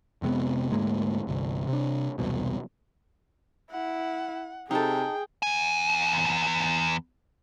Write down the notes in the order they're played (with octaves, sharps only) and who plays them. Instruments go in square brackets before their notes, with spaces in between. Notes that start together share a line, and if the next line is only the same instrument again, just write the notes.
[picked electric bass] F1 C3 G#3 B3
D2 G#2 G#3 A#3
G1 C2
C3 D4
E1 C2 B2
[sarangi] E4 [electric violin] F#5
[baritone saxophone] C3 [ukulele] D#4 A4 [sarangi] G#4 [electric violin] G5
[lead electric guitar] E2 G#5